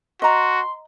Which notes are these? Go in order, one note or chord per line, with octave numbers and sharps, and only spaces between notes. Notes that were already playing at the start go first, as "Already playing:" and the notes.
F#4 D#5 A#5 C6